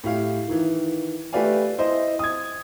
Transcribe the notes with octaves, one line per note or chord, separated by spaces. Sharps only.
A2 G4 F5
D#3 E3
A3 G4 B4 D5 F5 G#5
E4 C5 D#5
D#6 G#6